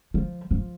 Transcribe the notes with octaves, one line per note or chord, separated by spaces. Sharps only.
F3
F3